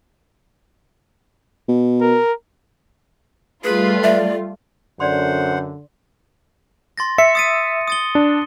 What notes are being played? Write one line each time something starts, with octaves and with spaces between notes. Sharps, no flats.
B2
A#4
G3 A3 F4 G#4 B4
D5 E5
F#2 D3 C5 D5 F#5 C6
C6 A6 A#6
E5 C#7
D#6 A6 D#7
D#6 A6 G7
D4